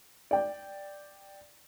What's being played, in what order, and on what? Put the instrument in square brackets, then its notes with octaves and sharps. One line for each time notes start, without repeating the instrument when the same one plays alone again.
[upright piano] D5 G5